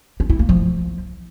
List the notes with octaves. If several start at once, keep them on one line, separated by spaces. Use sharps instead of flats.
D4
E4
A#3
F3